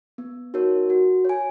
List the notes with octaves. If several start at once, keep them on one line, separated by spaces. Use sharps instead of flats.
B3
D#4 F#4 A#4 C#5
F#4
C#5 G#5